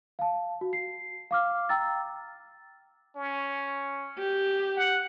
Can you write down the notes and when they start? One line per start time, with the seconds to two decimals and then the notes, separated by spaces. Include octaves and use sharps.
0.19 F5 A5
0.61 F#4
0.73 C7
1.31 F5 D6 F6
1.69 G5 A#5 E6 A6
3.16 C#4
4.18 G4
4.77 F#5